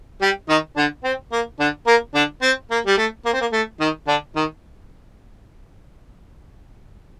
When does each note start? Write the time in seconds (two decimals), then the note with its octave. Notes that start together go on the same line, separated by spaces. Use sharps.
0.22 G3 G4
0.49 D#3 D#4
0.76 D3 D4
1.04 C4
1.32 A#3
1.60 D3 D4
1.87 A#3 A#4
2.15 D3 D4
2.42 C4
2.71 A#3
2.86 G3
2.97 A3
3.25 A#3
3.33 C4
3.41 A#3
3.53 A3
3.80 D#3 D#4
4.08 D3 D4
4.36 D#3 D#4